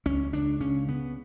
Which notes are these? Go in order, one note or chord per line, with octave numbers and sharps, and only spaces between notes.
C#2 C#4
C#2 D4
C#3 C#4
C#3 B3